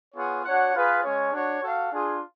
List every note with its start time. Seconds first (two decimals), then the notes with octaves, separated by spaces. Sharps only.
0.15 B3 F4 G#4 C#5 F#5
0.44 D4 F#4 C#5 F#5
0.74 F4 G#4 B4 F5
1.02 G#3 C#4 G#4 C#5
1.32 D4 F#4 C#5
1.60 F#4 A4 F5
1.91 D4 F4 G#4